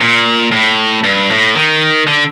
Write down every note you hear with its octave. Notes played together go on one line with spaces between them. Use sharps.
A#2
A2
G2
A2
D#3
D3